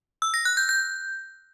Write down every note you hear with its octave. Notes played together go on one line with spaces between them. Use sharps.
E6
A#6
F#6
G6
G6